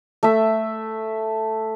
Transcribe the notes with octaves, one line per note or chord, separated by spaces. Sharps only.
A3 E5